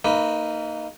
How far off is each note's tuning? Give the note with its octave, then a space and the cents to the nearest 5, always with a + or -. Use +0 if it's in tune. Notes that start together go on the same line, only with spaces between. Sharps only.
A#3 -25 D#4 +0 B4 +0